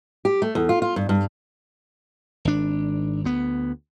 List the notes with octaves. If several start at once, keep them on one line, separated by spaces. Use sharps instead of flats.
G4
A3
E2
F4
F4
G2
G2
G#1 D4
D2 B3